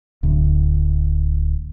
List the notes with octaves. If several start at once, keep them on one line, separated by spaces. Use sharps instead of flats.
D1 D2